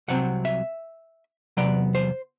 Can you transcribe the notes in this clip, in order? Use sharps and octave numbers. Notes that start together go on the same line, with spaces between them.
C2 C3 F#3 C4 F#5
E5
E2 C3 F#3 B3 D5
C5